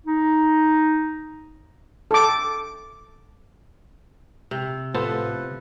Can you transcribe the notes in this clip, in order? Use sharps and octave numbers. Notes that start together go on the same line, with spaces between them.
D#4
A4 D6
C3
A2 F3 B3 A4 B4 C5 A5